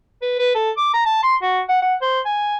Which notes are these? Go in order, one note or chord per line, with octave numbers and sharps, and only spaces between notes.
B4
B4
A4
D6
A#5
A5
C6
F#4
F#5
F#5
C5
G#5